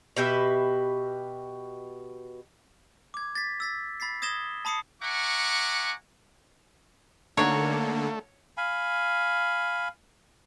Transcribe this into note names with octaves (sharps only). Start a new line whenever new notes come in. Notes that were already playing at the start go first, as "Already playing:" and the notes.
B2 G4 B4 E5
D6 G#6
A6 B6
E6 A6 B6
B5 A6 B6 C7
D#6 G#6 A#6 E7 G7
A5 B5 D#6 C7 C#7
E5 F#5 G#5 A#5 C#6 D6
D3 A3 A#3 D4 D#4 F#4 C#5
F5 G#5 B5